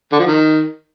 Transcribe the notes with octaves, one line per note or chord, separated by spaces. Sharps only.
D3
F3
D#3